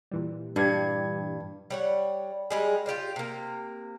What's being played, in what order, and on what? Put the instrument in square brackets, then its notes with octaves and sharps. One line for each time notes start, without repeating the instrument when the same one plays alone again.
[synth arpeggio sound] A#2 E3 G3
[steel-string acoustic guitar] G2 [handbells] D4 G4 G#6
[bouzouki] G3 C#5 F#5
G3 G#3 G#4
F4 G4 D5 F5
C3 A#3